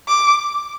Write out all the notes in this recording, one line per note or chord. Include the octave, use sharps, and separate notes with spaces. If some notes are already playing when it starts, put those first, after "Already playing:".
D6